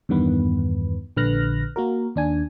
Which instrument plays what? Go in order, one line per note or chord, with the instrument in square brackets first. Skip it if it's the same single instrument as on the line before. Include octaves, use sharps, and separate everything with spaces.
[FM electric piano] E2 G2 D#3 B3 B4
A#1 D3 B4 F6 F#6 A#6
A#3 F#4 A#4
D#2 D4 G#5